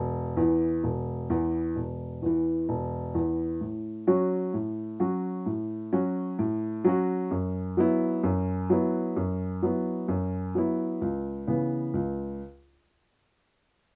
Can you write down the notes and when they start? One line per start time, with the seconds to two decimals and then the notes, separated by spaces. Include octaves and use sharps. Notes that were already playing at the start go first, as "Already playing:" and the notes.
Already playing: E1
0.37 E2 E3
0.84 E1
1.30 E2 E3
1.76 E1
2.22 E2 E3
2.69 E1
3.15 E2 E3
3.61 A2
4.07 F#3 C#4 F#4
4.54 A2
5.00 F#3 C#4 F#4
5.46 A2
5.93 F#3 C#4 F#4
6.39 A2
6.84 F#3 C#4 F#4
7.31 F#2
7.77 F#3 B3 E4
8.24 F#2
8.70 F#3 B3 E4
9.16 F#2
9.63 F#3 B3 E4
10.08 F#2
10.55 F#3 B3 E4
11.02 C#2
11.47 C#3 E3 B3
11.94 C#2